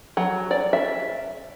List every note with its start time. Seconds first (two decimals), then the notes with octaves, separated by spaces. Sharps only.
0.17 F#3
0.51 D5
0.73 E5